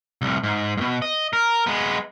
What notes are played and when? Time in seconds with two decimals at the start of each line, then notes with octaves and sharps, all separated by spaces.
0.22 C2 A2
0.44 G#2
0.77 G#2 B2
1.02 D#5
1.33 A#4
1.67 G#3 B3